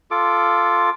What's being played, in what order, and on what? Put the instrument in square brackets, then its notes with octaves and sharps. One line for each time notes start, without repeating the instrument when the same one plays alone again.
[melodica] F4 A4 D6